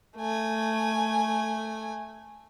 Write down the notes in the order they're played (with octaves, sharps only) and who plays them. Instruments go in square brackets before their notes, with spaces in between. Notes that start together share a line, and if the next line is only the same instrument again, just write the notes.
[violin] A3 G#5